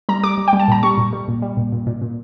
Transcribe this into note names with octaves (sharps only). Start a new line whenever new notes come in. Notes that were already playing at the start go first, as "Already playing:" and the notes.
G3 A#5
G3 D6
G3
G5
G3
A5
A#2 A#5
G3 C#6
A#2
G3
A#2
G3
A#2
A#2
A#2
A#2